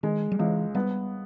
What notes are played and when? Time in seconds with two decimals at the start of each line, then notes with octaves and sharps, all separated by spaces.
0.03 D#3 G#3
0.32 G3
0.39 C#2 E3
0.75 G3 B3